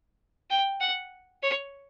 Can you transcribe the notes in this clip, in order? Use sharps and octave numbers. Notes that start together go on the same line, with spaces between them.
G5
F#5
C#5